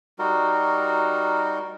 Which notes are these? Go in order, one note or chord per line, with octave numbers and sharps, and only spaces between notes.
G3 D#4 F#4 A#4